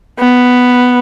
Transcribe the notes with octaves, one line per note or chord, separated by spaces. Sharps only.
B3